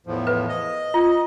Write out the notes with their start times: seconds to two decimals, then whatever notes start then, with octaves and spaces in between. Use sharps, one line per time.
0.07 E2 A2 F3
0.27 B4 E5
0.49 D#5
0.94 F4